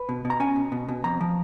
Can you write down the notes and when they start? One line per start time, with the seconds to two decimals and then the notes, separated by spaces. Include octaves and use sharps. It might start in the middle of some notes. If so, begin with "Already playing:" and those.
Already playing: B4
0.09 B2
0.25 B2
0.30 A#5
0.40 C#4 G#5
0.56 B2
0.72 B2
0.88 B2
1.04 F2 A#5
1.21 F3